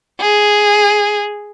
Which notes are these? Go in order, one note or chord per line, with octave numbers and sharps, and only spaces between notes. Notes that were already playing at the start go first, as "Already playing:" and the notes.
G#4